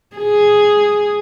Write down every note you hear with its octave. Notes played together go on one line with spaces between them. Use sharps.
G#4